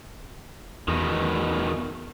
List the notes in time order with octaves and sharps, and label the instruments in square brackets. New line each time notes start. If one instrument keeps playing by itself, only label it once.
[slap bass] E2 [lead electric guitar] B2 D#3